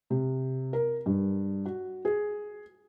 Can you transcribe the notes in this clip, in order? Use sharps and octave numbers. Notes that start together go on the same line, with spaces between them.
C3
A#4
G2
F#4
G#4